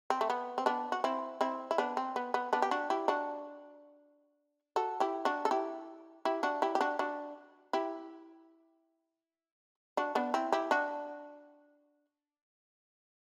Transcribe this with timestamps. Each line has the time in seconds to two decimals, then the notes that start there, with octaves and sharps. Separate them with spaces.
0.10 C4
0.21 A3
0.30 B3
0.58 C4
0.66 B3 D4
0.92 F#4
1.04 C4 E4
1.41 C4 E4
1.71 E4
1.78 B3 D4
1.97 C4
2.16 B3
2.34 B3
2.53 B3 D4
2.62 G4
2.71 D4 F#4
2.90 E4 G4
3.08 D4 F#4
4.76 F#4 A4
5.00 E4 G4
5.25 D4 F#4
5.45 A4
5.51 E4 G4
6.25 E4 G4
6.43 D4 F#4
6.62 E4 G4
6.75 G4
6.81 D4 F#4
6.99 D4 F#4
7.73 E4 G4
9.97 D4 F#4
10.15 B3 D4
10.34 C4 E4
10.52 E4 G4
10.71 D4 F#4